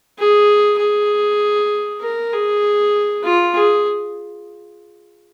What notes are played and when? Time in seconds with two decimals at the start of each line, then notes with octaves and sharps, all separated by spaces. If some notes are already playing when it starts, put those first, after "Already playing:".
0.19 G#4
0.79 G#4
2.01 A#4
2.32 G#4
3.24 F4
3.54 G#4